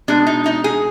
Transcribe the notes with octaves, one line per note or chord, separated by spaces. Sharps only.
B2 G#3 D4
D#4
D#4
G#4